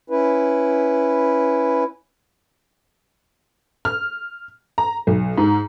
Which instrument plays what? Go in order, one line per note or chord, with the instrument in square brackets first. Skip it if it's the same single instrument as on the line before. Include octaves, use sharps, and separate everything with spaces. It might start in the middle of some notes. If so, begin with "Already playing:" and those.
[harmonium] C#4 E4 B4
[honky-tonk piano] F6
A#5
B1
G#2